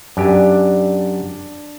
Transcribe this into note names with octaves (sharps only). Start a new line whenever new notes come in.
F#2 D4 G4 G#5